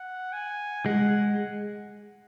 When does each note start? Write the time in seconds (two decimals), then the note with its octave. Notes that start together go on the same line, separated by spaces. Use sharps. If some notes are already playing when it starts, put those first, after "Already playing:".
Already playing: F#5
0.33 G#5
0.86 G#3 F#5